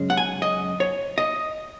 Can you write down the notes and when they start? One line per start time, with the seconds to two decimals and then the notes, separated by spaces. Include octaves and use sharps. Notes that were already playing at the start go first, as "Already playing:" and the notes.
Already playing: F#2 C#3 G#3 C#4
0.10 F#5
0.17 G#5
0.42 D#5
0.80 C#5
1.18 D#5